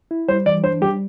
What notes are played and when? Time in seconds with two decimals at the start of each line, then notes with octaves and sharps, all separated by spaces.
0.11 E4
0.28 G3 C5
0.46 E3 D5
0.63 D4 C5
0.81 G3 G4